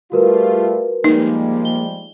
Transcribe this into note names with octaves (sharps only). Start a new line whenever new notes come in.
G3 A3 F4 F#4 A#4 B4
F3 G3 G#3 A#3 D#4
G7